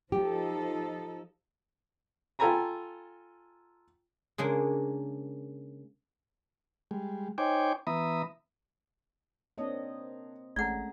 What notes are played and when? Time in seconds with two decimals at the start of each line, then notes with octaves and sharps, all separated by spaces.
0.12 F3 D#4 G4 A4
2.39 F4 A4 G5 G#5 A#5 B5
4.38 C#3 G#3 A#3 D4
6.91 G3 G#3
7.38 D#4 C5 C#5 G5 G#5 D6
7.87 E3 B3 E5 A#5 B5 D#6
9.58 A#3 C4 D4 C#5 D#5
10.56 A1 G#3 A3 C#4 D5 F#5 A#5